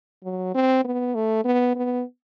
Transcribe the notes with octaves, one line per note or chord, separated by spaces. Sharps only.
F#3
C4
B3
A3
B3
B3